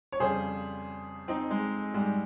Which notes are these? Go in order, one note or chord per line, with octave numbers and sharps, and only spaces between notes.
C#5
F2 C#3 G3 G#4 C5
C4 D#4
G#3
G#2 G3 G#3